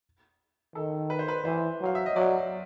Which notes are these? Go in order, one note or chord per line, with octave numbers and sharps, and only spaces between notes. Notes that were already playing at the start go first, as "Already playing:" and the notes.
D#3 A4
B4
C5
B4
E3 C5
F#3 F5
E5
D#5
F#3 D5